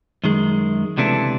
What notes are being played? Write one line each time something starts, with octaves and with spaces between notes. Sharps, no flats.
F#2 D#3 G#3
C#2 C3 E3 A3 D4